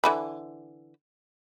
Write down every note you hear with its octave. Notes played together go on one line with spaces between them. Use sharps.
D3 E3 B5